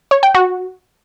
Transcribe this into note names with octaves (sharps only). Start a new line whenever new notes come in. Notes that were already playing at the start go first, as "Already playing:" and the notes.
C#5
G5
F#4